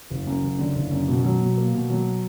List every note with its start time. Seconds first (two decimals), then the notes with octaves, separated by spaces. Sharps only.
0.10 F#1
0.27 F#2
0.43 F#1
0.59 D3
0.75 F#1
0.92 F#2
1.08 B2
1.24 F#3
1.41 B2
1.57 A#3
1.74 B2
1.90 F#3